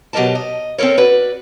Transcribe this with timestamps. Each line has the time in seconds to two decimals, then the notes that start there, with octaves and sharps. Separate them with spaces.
0.13 B2 F#3 G4 A#4 D#5 A5
0.35 D#5
0.78 C4 C#4 A4 A#4 C#5
0.97 F#4 B4 D5